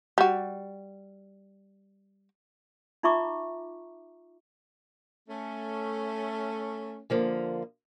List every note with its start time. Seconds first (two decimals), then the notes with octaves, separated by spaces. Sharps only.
0.18 G3 F#4
3.03 D#4 F4 E5 A#5 C#6 D6
5.28 A3 C#4
7.10 D3 F3 A#3